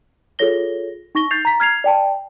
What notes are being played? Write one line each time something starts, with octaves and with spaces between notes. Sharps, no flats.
F4 G#4 A4 C#5 A#6 G7
D#4 C#6 A#6 G7
G6 A6 C7 F7
A#5 B6
F6 G#6 C7 F7
D5 G5 A5